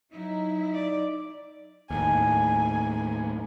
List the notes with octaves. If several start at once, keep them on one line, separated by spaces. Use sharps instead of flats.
F#3 D#4 E4
D5
D#2 A2 G#5